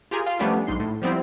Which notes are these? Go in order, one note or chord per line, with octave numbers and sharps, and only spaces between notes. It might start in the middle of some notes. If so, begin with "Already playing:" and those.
F4 G4 G#4 A#4
F4
F3 G3 A3 B3 C#4 D4
B1 G#2 C6
A2
F3 G3 B3 C4 E4